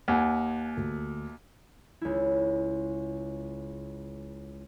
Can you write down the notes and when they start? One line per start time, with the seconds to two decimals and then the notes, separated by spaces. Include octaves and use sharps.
0.08 D#2 F#5 G#5
0.77 D2
2.01 C#2 E4